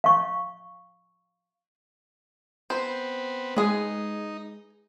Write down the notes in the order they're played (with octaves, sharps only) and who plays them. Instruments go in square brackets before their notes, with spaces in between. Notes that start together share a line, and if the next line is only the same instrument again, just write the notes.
[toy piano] F5 C#6
[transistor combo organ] B3 C4 [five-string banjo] C5
[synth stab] G#3 [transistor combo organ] D#4 [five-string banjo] G#4 B4